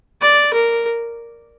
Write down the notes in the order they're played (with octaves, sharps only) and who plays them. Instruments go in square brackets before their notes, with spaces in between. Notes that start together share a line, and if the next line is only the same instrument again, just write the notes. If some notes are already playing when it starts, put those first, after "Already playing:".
[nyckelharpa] D5
A#4